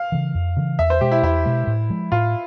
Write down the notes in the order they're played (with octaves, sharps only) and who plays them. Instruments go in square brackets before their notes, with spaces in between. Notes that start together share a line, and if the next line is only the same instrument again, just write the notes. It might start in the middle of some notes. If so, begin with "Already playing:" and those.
Already playing: [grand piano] F5
[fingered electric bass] C#3 E3
F2
C#3 E3
[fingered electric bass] E2 [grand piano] E5
[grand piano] C5
[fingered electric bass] B2 G#3 [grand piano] G4
[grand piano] E4
[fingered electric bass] E2 [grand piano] E4
[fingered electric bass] B2 G#3
A2
F3 G#3
[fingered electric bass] A2 [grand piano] F4